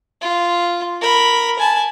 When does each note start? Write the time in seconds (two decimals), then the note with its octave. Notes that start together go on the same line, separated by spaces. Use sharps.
0.22 F4
1.01 A#4 B5
1.59 G#5 A5